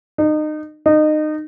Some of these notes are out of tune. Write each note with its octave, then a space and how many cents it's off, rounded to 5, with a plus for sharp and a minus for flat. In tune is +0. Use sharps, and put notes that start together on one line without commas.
D#4 -30
D#4 -25